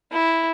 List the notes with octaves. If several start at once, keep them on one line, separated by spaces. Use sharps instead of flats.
E4